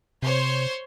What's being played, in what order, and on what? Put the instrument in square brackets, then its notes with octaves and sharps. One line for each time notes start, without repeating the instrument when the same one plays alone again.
[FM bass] C3 [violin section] C5 C#5 C6